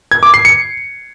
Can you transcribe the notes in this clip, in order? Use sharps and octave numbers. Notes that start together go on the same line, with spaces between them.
G#6
D6
C7
C#7